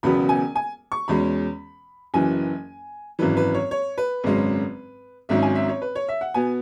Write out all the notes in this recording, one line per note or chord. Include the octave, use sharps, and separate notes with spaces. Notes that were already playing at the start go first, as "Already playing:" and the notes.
E1 E2 C#3 F#3 B3 B5
G#5
G#5
C#6
E2 B2 G#3 C#4 B5
F#1 F#2 E3 G#5
G#1 F#2 E3 B4
B4
C#5
C#5
B4
G#1 F#2 C#3 G#3 C#4
G#1 G#2 F#3 C#4 E5
G#5
E5
C#5
B4
C#5
E5
F#5
B2 B3 G#5